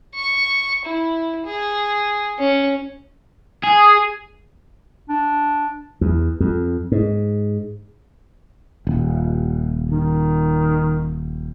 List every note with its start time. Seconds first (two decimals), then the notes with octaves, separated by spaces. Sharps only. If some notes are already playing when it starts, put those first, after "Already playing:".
0.15 C#6
0.85 E4
1.46 G#4
2.39 C#4
3.63 G#4
5.09 D4
6.01 E2
6.40 F2
6.92 G#2
8.87 D#1
9.91 D#3